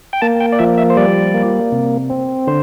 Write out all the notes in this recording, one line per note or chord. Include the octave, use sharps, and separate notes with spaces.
G5
A#3 A5
G5
D5
F3 E5
E5
C5
G3 D5
A#3
C3
C4
D3 C5